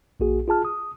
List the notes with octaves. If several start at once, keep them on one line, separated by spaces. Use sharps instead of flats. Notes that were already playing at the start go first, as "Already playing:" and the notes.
A#1 A#3 F#4 G#4
F4 G#4 A5 F6
D#6